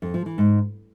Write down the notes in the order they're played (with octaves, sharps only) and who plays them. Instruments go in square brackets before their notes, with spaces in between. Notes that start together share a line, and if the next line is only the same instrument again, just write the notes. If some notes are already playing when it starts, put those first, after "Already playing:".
[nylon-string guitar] F2
F3
E3
G#2